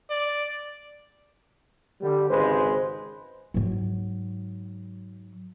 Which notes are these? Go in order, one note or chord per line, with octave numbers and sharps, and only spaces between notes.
D5
D3 G3
G#1 C#3 G#3 B4 C5
G#2 F#3